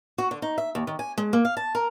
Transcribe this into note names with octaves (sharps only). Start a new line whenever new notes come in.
F#4
D3
D#4
E5
D#2
D#3
G#5
G#3
A#3
F5
A5
A#4